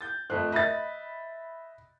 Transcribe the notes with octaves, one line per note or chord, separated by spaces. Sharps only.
G6 A6
F2 A3 C5 F#6
D#5 E5 B5 A6